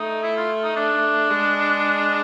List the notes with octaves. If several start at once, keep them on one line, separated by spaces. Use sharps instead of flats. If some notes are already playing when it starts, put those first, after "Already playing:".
Already playing: A3 D#4
E4
F4
D#4
D4
G#3